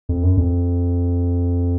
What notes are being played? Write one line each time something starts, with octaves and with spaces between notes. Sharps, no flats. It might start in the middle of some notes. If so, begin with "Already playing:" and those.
F2
F#2
F2